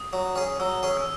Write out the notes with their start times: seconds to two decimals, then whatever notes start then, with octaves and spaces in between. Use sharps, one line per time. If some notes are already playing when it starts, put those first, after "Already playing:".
Already playing: D#6
0.13 F#3
0.36 C#4 G#4
0.60 F#3 E6
0.83 C#4 G#4
0.97 E6